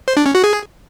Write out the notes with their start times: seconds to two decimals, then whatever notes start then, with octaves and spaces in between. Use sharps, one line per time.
0.08 C5
0.17 D4
0.26 C#4
0.35 F#4
0.44 G#4